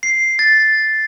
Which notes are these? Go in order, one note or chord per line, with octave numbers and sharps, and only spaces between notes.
C7
A6